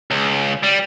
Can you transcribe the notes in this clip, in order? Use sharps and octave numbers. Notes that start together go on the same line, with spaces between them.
C#2
G3